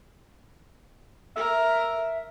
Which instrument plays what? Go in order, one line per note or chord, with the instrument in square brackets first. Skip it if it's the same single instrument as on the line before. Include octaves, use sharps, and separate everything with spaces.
[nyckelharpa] A#4 [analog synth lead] E5